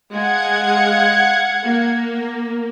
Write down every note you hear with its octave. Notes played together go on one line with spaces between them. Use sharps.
G#3 F5 F#5 G#6
A#3